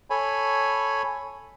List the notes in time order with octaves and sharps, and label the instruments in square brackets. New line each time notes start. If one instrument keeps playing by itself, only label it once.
[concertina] A4 C#5 G#5 B5